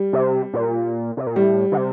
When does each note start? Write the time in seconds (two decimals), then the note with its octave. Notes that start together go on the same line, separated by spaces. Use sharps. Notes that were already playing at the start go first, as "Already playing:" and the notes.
Already playing: G3
0.13 C3
0.53 A#2
1.17 C3
1.27 A#2
1.36 A2 G3
1.72 D3
1.77 C3